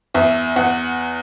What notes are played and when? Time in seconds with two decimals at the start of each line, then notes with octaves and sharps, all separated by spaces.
0.15 E2 E5
0.56 E2 F#5